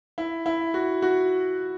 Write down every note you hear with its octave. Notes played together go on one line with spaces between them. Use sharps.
E4
E4
F#4
F#4